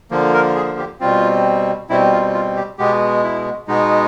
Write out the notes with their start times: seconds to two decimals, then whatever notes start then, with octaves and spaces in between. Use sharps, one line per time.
0.11 D3 F3 A#3
0.34 A#4
0.56 G#4
0.78 G4
1.00 B2 G3 C4 F4
1.89 B2 G3 C4 E4
2.12 F4
2.34 F4
2.56 G4
2.78 B2 G#3 B3 G4
3.24 E4
3.68 B2 G#3 B3 D#4